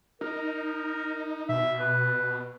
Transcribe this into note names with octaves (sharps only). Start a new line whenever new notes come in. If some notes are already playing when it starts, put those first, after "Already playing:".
D#4 A#4
B2 E5
B4